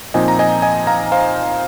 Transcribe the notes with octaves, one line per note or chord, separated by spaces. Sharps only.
A#2 F3 C4 D#4 D#5 G#5
A#5
D#5 G#5
D#5 G#5
F5 A#5
C5 F5